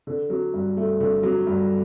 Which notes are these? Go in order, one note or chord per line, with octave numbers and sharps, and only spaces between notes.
D3
F#3
G2
A3
D3
F#3
G2